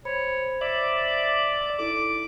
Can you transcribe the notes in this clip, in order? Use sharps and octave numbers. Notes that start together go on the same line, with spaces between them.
C5 C#5 B5
D5 E5
D#4 E4 A4 D6